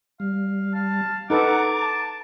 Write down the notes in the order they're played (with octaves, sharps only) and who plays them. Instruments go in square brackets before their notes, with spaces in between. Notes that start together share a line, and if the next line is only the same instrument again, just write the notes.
[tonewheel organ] G3 [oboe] F5
[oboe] F5 [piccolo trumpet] A5
[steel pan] D#4 A4 B4 [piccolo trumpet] F#5 [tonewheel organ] A#5 G#6 A6 [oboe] D6
[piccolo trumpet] A5